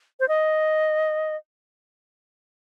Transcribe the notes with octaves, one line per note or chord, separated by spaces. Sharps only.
C5
D#5